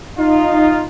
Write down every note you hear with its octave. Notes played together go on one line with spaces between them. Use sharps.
D#4 F4